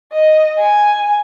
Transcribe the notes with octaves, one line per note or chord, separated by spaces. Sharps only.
D#5
G#5